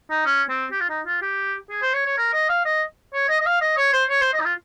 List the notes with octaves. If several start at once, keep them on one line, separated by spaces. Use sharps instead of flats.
D#4
C#4
C4
G4
F4
D#4
F4
G4
G#4
C5
C#5
C#5
A#4
D#5
F5
D#5
C#5
D#5
D#5
F5
D#5
C#5
C5
C#5
C5
D#5
D#4
F4